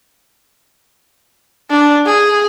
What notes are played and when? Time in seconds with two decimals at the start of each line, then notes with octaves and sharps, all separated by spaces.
1.71 D4
2.06 G#4